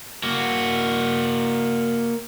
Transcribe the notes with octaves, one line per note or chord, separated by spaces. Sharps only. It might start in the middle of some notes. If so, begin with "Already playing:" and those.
A#3 F#4